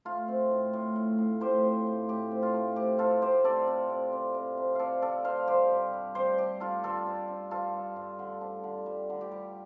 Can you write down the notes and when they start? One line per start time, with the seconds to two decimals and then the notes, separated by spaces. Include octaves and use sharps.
0.05 A3 F4
0.28 C4
0.51 A2
0.73 A2
0.96 A2
1.18 A2
1.41 A2 G4 C5
1.64 C4
1.87 A2
2.09 A2 G4
2.31 C4
2.43 F4
2.54 A3
2.76 C3 G4
2.99 C4 F4 A4
3.22 C3 G4 C5
3.44 C3 A4 D5
3.67 C3
3.90 C3
4.13 C4
4.35 C3
4.57 C3
4.75 C4 A4 D5 F5
5.02 C4 A4 D5
5.25 C3 C5 F5
5.47 G2 G4 C5
5.71 G2
5.93 G3
6.15 G2 G4 C5
6.38 D4 G4
6.60 D4 F4 A4
6.83 G2 F4 A4
7.06 G2
7.28 D4
7.51 G2 F4 A4
7.73 G2
7.96 G2
8.19 D3
8.41 D4
8.64 D3
8.86 G3
9.10 D3
9.21 G4
9.32 G3